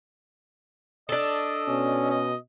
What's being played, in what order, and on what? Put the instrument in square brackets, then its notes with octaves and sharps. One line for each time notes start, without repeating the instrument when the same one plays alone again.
[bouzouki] D4 A4 [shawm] D#5
[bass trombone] B2 [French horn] C#4
[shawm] D#5